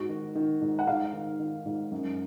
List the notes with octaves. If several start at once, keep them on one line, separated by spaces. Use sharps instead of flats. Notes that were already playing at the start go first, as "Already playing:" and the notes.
Already playing: G#2 F#4
D#3
D#3
G#2
F#5
G#2 F5
D#3
D#3
G#2
F#2